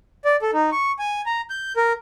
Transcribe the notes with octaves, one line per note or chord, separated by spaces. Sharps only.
D5
A4
D#4
C#6
G#5
A#5
G6
A#4